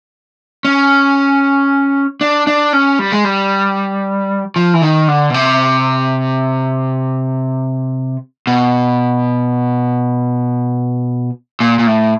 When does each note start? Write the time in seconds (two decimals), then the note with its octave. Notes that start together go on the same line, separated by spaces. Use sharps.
0.65 C#4
2.21 D4
2.47 D4
2.73 C#4
2.99 G3
3.12 G#3
3.24 G3
4.56 F3
4.74 E3
4.82 D#3
5.08 D3
5.30 B2
5.34 C3
8.47 B2
11.60 A#2
11.79 A#2
11.87 A2